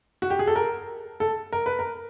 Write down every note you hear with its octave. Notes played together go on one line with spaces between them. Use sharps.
F#4
G4
G#4
A4
A#4
A4
A#4
B4
A#4